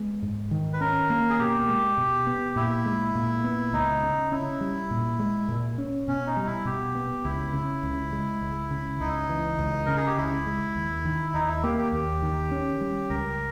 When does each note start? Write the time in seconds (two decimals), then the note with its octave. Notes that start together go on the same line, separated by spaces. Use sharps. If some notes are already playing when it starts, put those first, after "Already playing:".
Already playing: G#3 B3
0.22 G#2
0.51 D#3
0.73 B4
0.81 C#4 A#4
1.10 A#3
1.30 G#4
1.39 B2 G4
1.68 G#3
1.98 B2
2.27 B3
2.56 A#2 E4
2.86 G#3
3.15 A#2
3.44 B3
3.73 C#2 D#4
4.03 C#3
4.32 C#4 E4
4.61 G3
4.91 A#2
5.19 G#3
5.49 A#2
5.78 C#4
6.08 B2 C#4
6.27 D#4
6.37 G3
6.46 E4
6.65 B2 G4
6.95 B3
7.24 C#2 E4
7.53 C#3
7.83 C#2
8.12 G#3
8.42 C#2
8.71 C#3
9.00 C#2 D#4
9.29 E3
9.59 C#2
9.86 C#3 A#4
9.97 G#4
10.07 G4
10.17 C#2 E4
10.46 G#3
10.76 D#2
11.05 D#3
11.34 D#2 D#4
11.49 E4
11.63 A#3 G4
11.78 G4
11.92 D#2 G4
12.22 D#3
12.51 C#4
12.81 G3
13.10 C#2 A#4